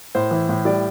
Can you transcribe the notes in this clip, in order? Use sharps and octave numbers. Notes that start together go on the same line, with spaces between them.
A2 C5
E3
A2
G3 D5